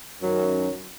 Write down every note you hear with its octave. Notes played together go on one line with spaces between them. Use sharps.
F#2 D#3 F#3 C#4